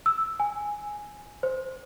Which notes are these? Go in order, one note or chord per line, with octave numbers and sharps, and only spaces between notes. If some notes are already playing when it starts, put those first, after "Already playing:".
E6
G#5
C5